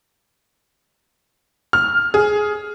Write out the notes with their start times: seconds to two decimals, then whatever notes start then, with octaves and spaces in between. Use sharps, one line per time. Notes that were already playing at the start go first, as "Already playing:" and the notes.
1.73 F6
2.14 G#4